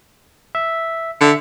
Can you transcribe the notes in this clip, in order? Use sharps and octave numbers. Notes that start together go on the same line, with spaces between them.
E5
D3 E5 C#7